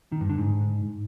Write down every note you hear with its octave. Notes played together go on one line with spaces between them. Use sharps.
D#3
G2
D3
G#2